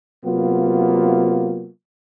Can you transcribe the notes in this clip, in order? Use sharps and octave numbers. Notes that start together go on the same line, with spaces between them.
C3 F#3 A#3 B3 F4